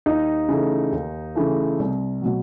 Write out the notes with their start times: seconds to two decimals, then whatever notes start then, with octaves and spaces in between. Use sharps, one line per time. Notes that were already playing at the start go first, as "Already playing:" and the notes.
0.06 D#2 D#4
0.49 C#3 E3 A3
0.92 D#2
1.35 C#3 E3 A3
1.79 C2
2.22 B2 F#3